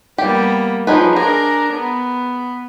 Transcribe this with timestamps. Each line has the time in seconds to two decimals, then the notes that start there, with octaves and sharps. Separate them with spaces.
0.18 G3 A#3 B3 G4
0.87 F3 F#3 D#4 G#4 B4
1.16 D4 G#4 A#4 A#5
1.74 B3